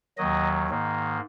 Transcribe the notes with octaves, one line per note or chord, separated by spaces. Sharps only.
D#2 D#3 F#3 D#5
G#2 D#3 A#3